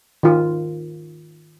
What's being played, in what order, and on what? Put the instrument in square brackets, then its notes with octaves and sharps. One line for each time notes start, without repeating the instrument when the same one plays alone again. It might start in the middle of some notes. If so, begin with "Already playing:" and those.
[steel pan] D#3 F4